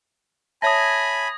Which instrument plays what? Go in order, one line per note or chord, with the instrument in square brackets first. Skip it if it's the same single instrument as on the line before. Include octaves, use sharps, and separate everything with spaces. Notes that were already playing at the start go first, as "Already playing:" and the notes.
[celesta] C#5 E5 A5 [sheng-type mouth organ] G#5 B5 [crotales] D#6 G#6 A#6